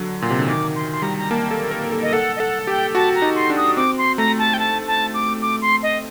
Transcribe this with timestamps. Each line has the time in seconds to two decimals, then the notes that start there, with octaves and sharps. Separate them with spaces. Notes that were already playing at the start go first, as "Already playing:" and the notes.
Already playing: D3 F#3
0.21 A#2 C6
0.30 C3
0.39 D3
0.48 D#3 D6
0.75 C6
0.92 C6
1.02 G3 A#5
1.18 A#5
1.30 A#3 A5
1.51 A4
1.71 A#4
1.84 A#4
1.92 A4
2.02 D#5
2.13 A4 F#5
2.36 D#5
2.40 A4 F#5
2.67 G4 G5
2.95 F#4 A5
3.15 A#5
3.22 D#4
3.36 C6
3.50 D4
3.57 D#6
3.77 C4 D6
3.98 C6
4.18 A3 A#5
4.39 A5
4.54 G5
4.59 A5
4.87 A5
5.14 D6
5.42 D6
5.62 C6
5.83 D#5